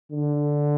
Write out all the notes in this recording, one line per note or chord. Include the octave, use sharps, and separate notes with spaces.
D3